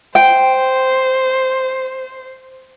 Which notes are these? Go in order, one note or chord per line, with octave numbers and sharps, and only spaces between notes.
C5 G5